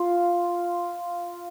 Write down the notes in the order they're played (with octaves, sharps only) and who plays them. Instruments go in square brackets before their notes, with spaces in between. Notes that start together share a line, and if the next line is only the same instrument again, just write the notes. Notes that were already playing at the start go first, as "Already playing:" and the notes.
Already playing: [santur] F4